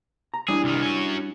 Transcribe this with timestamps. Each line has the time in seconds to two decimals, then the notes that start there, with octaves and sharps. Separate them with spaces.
0.34 A#5
0.48 G3 D4 E4 G#4
0.64 C2 D#3
0.83 F#3 C#4